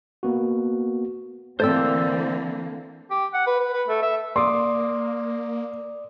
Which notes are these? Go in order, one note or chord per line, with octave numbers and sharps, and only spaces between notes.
A#3 B3 F#4
D3 E3 A3 A#3 C4 C5 D5 E6
G4
F#5
B4
B4
B4
A3
E5
A#3 D5 C6 D6 D#6